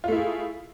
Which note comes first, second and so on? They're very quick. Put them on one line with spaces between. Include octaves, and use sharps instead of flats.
F4 A3 E4 G#4